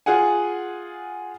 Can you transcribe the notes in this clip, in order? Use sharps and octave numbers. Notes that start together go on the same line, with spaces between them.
F4 G#4 F#5 G#5